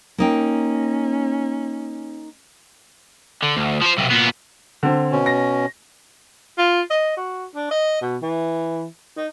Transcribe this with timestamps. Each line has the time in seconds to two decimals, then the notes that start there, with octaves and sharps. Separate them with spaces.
0.18 A#3 C#4 D#4 G5
3.43 D3
3.56 D2
3.81 F3 C5
3.98 B1 C3
4.10 A#2 B3
4.83 D3 C4
5.12 B2 C#4
5.26 A#6
6.58 F4
6.91 D#5
7.17 F#4
7.55 D4
7.71 D#5
8.02 B2
8.22 E3
9.17 D#4